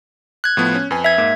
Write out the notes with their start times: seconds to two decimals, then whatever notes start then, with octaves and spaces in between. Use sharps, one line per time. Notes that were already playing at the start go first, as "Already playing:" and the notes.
0.44 F#6 G#6
0.57 A2 F3 B3
0.75 C#4
0.91 F2 B4 G#5
1.04 E5 G#6
1.18 G#2 A#3